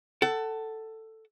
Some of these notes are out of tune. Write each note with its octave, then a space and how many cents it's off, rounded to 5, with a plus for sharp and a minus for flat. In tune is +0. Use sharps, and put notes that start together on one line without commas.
A4 +10 F#5 +30